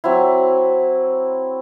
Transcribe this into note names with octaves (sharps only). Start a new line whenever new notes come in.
F#3 C4 E4